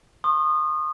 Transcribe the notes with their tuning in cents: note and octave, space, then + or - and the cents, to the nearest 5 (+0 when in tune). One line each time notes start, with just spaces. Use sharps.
C6 +45 D#6 -25